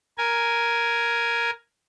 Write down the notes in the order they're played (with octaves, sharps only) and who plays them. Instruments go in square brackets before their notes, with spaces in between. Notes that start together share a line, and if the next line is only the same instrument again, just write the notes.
[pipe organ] A#4 G#5